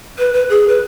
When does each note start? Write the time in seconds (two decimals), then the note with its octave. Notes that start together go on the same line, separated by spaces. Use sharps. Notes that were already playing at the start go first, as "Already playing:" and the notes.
0.19 B4
0.33 B4
0.49 G#4
0.68 B4